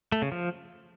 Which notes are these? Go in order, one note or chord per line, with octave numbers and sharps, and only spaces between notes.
A3
C#3
F3